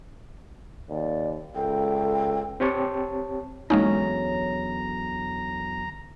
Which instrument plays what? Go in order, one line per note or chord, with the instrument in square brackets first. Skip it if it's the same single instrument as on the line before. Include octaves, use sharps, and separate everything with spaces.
[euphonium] D#2 [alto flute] D5
[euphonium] C#2 [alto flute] A4 [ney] G5
[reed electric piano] C4 G4 C#5 A5
[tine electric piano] E2 D3 F#3 [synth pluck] G#3 A#3 D#4 [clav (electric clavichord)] C#4 [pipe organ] A#5